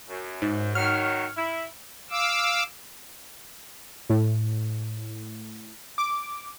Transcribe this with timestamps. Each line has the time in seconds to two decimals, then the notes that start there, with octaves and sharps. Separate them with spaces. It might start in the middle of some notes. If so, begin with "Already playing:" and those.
0.08 F#2
0.42 G#2
0.75 D#3 F#3 C#5 F6
1.37 E4
2.10 F5 D6 E6
4.10 A2
5.98 D6